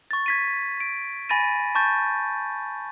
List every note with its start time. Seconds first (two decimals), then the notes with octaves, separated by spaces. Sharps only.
0.11 C#6 A6
0.26 G#6 B6 D#7
0.80 D7
1.29 G#5 B5 A6 A#6 D#7
1.75 A5 C#6 G6 A6